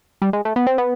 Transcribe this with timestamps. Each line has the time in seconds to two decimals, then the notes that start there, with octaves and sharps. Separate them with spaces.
0.22 G3
0.33 G#3
0.45 A3
0.56 B3
0.67 C4
0.78 B3